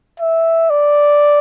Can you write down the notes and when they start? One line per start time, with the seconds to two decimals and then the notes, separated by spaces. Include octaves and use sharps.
0.20 E5
0.70 D5